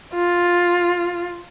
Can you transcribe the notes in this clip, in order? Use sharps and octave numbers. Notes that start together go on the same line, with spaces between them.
F4